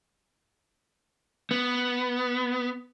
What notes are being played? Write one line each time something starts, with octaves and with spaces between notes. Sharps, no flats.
B3